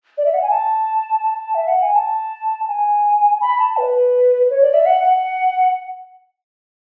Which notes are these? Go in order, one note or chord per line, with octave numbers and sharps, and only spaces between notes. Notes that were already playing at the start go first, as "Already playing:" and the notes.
D5
E5
F#5
G#5
A5
A5
E5
F#5
G#5
A5
G#5
B5
A5
B4
C#5
D5
E5
F#5
F#5